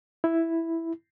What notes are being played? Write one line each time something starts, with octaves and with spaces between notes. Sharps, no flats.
E4